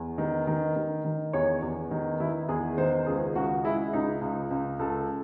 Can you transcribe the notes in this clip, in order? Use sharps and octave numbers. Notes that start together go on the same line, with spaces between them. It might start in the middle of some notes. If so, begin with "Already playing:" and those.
Already playing: E2
D#3
D#3
D#3
D#3
E2 C#5
E2
D#3
D#3 E4
E2 G#4
D#3 C5
C#2 G#4
C#2 F#4
G#3 E4
C#2 D#4
C#2
C#2
C#2 A4